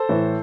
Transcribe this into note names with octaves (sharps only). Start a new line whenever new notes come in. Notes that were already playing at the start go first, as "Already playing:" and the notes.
Already playing: A4 C5
A2 E3